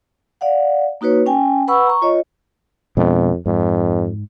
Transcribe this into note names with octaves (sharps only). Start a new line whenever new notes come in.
D5 F5 F#5
A#3 D#4 F#4 B4 C#5
C#4 G5 G#5
B4 F#5 B5 C#6 E6
A#5 C#6
F4 C#5 D#5
F2 B2 G#3 D4
F2 G#2